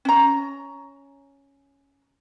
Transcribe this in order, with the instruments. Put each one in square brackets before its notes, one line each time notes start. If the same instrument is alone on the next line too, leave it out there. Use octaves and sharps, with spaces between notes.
[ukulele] C#4 A#5